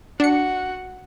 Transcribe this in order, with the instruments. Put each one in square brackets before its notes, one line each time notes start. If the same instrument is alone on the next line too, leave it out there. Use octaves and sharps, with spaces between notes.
[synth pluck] D4 C#7 [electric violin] F#4 F#5